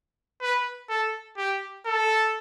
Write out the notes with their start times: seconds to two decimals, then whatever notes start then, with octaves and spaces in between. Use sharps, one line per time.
0.41 B4
0.89 A4
1.37 G4
1.86 A4